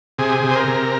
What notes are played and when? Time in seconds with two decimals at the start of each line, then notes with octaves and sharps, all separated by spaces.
0.18 C3 G#4
0.44 C3
0.51 C5
0.56 A#4
0.68 C3